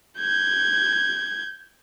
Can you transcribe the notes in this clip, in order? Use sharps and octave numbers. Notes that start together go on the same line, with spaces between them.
G6 G#6